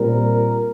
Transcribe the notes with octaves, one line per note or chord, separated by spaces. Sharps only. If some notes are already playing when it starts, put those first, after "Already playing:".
Already playing: A#2 G3 C4 A#4